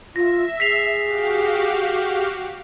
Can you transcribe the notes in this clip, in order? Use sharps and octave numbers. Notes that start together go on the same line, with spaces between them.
F4 E5 A#6
G#4 B6 C7 F7
F#4 G4 F5